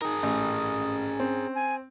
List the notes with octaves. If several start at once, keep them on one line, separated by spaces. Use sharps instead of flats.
D#4 G#4 A#4 D#6
A1 C#4
C4
G#5